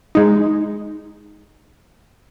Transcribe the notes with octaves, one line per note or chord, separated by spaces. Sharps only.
G#3 D#4